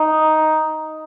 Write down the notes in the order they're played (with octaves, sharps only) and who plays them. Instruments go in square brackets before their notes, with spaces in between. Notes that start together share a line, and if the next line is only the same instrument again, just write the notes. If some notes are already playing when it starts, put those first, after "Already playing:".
Already playing: [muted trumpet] D#4